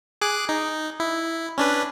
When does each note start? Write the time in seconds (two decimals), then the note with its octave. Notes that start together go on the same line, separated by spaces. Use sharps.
0.22 G#4 D6 F#6
0.49 D#4
1.00 E4
1.58 C#4 D4 B4